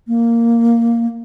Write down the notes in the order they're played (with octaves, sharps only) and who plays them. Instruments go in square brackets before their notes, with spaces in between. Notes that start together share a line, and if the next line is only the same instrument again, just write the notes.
[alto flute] A#3